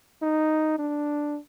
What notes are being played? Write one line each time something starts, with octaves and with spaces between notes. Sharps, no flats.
D#4
D4